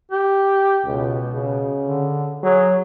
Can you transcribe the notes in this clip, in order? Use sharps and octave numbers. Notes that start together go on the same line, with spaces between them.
G4
C#2 B2
C#3
D3
F#3 G#4